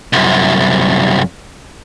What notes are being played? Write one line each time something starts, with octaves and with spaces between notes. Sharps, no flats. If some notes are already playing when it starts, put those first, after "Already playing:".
C2 F#2